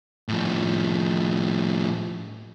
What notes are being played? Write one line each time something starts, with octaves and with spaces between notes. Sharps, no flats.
A2 F3